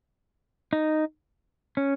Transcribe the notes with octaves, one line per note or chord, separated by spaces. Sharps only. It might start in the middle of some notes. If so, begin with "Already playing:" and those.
D#4
C#4